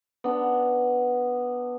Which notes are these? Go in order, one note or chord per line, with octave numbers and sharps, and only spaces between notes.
B3 D4